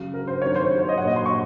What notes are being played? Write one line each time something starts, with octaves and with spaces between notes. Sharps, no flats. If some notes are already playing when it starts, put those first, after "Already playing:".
Already playing: C#3 F#3
A#4
C5
C3 D#3 F#3 C#5
C5
C5
C#5
D#5
A#2 F#3 F#5
D#5
C6
C#6